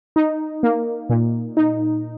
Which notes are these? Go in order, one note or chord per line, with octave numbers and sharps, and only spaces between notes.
D#4
A#3
A#2
D#4